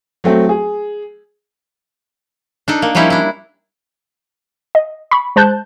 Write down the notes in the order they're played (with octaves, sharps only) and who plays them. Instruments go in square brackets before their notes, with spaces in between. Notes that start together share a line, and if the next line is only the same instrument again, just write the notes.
[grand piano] F#3 A3 C4
G#4
[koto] D4 D#4 A4
A#3
F3 G3 C#4 D#4 E4
D4 E4
[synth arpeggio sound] D#5
B5 C#6
G#3 C5 A5 F#6 G6